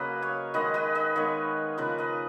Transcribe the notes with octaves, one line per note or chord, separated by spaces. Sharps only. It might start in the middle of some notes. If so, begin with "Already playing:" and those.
Already playing: C#3 F#3 A#3 G#4 B4 D#5
C#5 F5
D#3 G#3 B3 B4 D#5
B4 D#5
B4 D#5
D#3 G#3 B3 C#5 F5
C#3 F3 A#3 B4 D#5
B4 D#5